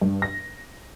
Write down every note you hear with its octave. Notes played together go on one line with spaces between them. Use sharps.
G2
A#6